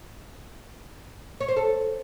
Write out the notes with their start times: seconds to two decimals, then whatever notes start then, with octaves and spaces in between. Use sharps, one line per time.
1.41 C#5
1.48 C5
1.56 A4